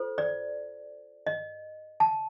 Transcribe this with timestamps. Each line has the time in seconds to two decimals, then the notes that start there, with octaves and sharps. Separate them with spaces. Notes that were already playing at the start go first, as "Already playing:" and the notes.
Already playing: F4 A4 C5
0.18 D5
1.27 D#5
2.00 A5